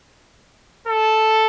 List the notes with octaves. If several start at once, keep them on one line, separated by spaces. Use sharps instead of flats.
A4